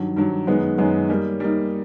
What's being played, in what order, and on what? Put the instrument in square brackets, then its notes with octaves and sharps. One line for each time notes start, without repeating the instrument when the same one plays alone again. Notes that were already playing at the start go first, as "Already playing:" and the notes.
Already playing: [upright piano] G2 D#3 F#3
G2 D#3 F#3
F#2 D#3 G#3 B3
F#2 D#3 G#3 B3
G3 A#3 D#4
G3 A#3 D#4